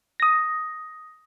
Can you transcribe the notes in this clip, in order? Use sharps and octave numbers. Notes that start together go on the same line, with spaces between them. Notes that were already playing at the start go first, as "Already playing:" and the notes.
D#6 A#6